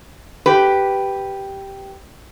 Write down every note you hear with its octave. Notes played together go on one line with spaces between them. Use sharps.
G4 B4